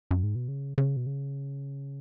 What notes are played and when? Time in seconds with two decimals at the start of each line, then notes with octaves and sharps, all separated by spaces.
0.11 F#2
0.23 G#2
0.35 B2
0.48 C#3
0.78 C#3
0.97 B2
1.06 C#3